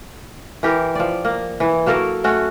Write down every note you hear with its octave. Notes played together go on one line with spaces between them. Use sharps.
E3 G4 A#4
F3 D5
A#3
E3
F#3 A#3 A4 A#4
A3 C#4 F#4